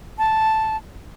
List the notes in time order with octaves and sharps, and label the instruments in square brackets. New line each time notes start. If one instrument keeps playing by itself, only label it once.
[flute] A5